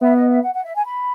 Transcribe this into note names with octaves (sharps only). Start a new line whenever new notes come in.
B3 E5
D#5
E5
F#5
F#5
E5
G#5
B5